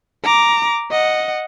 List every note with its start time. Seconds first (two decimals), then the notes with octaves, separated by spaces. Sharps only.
0.24 A#5 D6
0.92 D#5 F#5